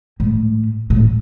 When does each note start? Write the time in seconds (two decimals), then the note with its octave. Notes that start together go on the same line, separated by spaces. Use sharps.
0.20 A2
0.90 A2